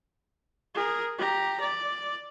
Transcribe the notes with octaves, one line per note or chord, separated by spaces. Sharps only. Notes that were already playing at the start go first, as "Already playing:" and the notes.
G#4 A#4
G4 A#5
D5